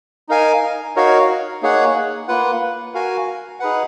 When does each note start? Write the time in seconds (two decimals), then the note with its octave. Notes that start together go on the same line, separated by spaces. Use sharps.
0.29 D#4 A#4 F5 G#5
0.96 D#4 F#4 A#4 C#5 F5
1.62 A#3 D#4 G#4 C#5 F#5
2.28 A#3 F4 B4 F#5
2.94 F#4 A#4 F5 G#5
3.60 D#4 G#4 B4 F#5